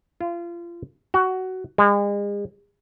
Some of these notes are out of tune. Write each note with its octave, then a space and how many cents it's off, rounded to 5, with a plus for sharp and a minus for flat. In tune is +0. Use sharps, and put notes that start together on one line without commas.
F4 -30
F#4 +15
G#3 -40